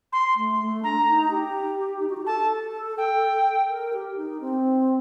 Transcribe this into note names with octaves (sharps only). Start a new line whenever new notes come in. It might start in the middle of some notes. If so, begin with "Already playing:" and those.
C6
A3
A3
D4 A#5
D#4
G4
D#4
F#4
G4
A4 A5
G5
A#4
G4
D#4
C4